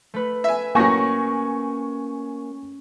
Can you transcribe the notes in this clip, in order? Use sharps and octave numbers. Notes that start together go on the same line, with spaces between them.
A3 B4
E5 G#5
A2 F#3 A#3 C#4 G#5 C#6 A#6 E7